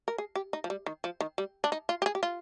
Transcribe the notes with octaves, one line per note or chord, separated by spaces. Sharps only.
A#4
G#4
G4
D#4
F3
G3
D#3
F3
D#3
G3
D4
D#4
F4
G4
G#4
G4
F4